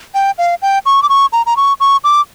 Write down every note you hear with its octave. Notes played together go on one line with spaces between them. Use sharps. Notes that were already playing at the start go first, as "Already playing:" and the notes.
G5
F5
G5
C#6
D6
C#6
A#5
A#5
C#6
C#6
D6